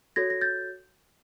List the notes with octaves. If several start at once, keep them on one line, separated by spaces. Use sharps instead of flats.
F#4 A4 C#5 G#6 A#6
A#6
G6 A6